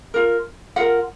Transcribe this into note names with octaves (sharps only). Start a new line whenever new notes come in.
F4 A#4
F4 A#4 F#5